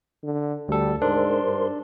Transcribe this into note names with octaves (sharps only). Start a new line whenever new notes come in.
D3
D2 G3 A4
G#2 D4 A#4 C5 C6
G2